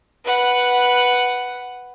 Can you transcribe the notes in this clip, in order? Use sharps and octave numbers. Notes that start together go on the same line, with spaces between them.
B4 F#5